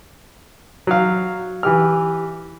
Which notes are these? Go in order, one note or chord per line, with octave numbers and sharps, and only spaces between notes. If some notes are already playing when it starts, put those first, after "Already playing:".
F#3 F5
E3 G4 F6